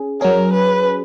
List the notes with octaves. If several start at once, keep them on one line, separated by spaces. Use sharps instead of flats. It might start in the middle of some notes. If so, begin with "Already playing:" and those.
Already playing: C#4 G#4
F#3 C#4 G#4 A#4
B4